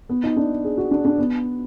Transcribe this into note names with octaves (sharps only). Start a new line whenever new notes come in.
B3
D#4
D4
G#4
F#4
D4
D4
B3